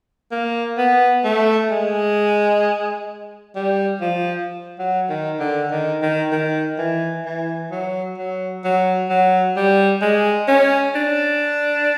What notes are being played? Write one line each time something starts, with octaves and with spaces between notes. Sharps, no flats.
A#3
B3
A3
G#3
G3
F3
F#3
D#3
D3
D#3
D#3
D#3
E3
E3
F#3
F#3
F#3
F#3
G3
G#3
C#4
D4